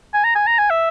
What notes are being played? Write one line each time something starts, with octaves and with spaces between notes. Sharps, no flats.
G#5
A#5
G#5
A#5
G#5
E5